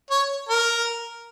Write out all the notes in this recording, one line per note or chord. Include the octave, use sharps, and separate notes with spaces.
C#5
A#4